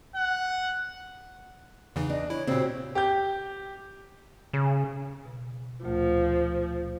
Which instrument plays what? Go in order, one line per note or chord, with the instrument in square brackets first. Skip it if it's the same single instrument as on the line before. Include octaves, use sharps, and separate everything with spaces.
[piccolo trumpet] F#5
[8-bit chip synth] E2 C#3 E3 [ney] D#4
[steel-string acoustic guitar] D4 [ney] D#5
[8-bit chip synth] E4 [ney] C#5
[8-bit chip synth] A#2 C#3 [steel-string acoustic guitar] C4 F#4 G4
[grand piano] G4 G6
[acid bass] C#3
[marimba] B2
[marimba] D2 A#2 A3 [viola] F3